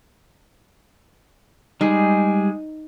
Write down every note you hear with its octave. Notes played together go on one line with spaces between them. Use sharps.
G3 G#3 D#4 G#4